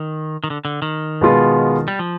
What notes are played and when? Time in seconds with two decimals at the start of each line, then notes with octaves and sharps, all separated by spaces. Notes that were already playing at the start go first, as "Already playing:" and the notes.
Already playing: D#3
0.44 D#3
0.50 D3
0.65 D3
0.82 D#3
1.21 B2 G#3 B3 F4
1.88 G3
1.99 F3